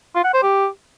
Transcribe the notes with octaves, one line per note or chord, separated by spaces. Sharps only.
F4
F#5
C5
G4